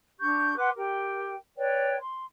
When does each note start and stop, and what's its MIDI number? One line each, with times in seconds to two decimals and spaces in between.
0.20 0.56 62
0.20 0.56 67
0.20 0.56 85
0.20 0.56 91
0.57 0.69 71
0.57 0.69 78
0.57 0.69 84
0.57 0.69 86
0.76 1.34 67
0.76 1.34 70
0.76 1.34 79
1.56 1.95 71
1.56 1.95 73
1.56 1.95 74
1.56 1.95 79
1.99 2.23 84